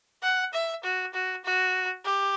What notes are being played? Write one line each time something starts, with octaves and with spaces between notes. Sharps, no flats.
F#5
E5
F#4
F#4
F#4
G4